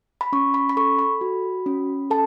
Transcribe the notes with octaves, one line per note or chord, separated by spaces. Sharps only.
B5
C#4 C#6
B5
B5
A4 C#6
B5
F#4
C#4
A4 A5